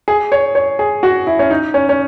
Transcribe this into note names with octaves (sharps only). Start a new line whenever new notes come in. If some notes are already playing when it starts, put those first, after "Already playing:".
G#4
C#5
C#5
G#4
F#4
E4
C#4
D#4
C#4
C#4